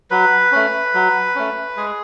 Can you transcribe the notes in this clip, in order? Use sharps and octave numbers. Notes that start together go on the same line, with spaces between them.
F#3 B4
A3 C#4
F#3
A3 C#4
G#3 G#4